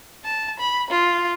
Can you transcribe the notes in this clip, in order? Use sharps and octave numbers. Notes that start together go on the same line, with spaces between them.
A5
B5
F4